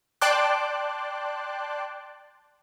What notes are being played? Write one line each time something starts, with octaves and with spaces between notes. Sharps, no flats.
D5 G5 A5 C6 D6 F#6